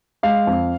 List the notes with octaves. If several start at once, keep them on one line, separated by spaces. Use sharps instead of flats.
G#3 F5
F2